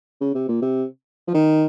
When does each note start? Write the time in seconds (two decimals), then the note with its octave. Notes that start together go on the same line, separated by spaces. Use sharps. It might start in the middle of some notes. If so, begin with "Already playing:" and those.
0.21 C#3
0.35 C3
0.49 A#2
0.62 C3
1.28 F3
1.34 D#3